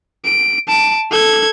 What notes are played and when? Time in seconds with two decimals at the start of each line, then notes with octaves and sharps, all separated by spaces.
0.25 D7
0.68 A5 D7
1.11 A4 G#6